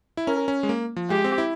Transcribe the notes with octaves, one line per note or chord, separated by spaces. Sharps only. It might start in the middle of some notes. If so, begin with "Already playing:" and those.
E4
C#4 A#4
C#4
G#3
A#3
F3
G#3 G4
C4
E4